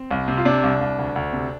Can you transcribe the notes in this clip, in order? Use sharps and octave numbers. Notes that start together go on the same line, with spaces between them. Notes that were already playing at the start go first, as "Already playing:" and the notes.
Already playing: C4
C2
C3
F4
C3 D4
C2
C2
D2
D2
C3